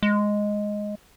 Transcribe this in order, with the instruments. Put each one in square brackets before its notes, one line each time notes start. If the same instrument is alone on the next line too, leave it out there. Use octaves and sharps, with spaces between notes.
[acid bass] G#3